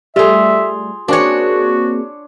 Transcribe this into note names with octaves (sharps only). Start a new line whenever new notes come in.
G3 A3 F4 G#4 E5
A#3 C4 D4 F#4 G#4 C#5